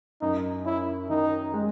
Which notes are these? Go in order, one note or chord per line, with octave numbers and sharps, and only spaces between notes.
F#2 D#4
C#4 E4
D#3 D#4
G#3